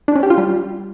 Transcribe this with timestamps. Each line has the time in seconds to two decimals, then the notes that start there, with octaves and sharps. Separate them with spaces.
0.08 D4
0.15 C#4
0.23 G4
0.30 F4
0.38 G3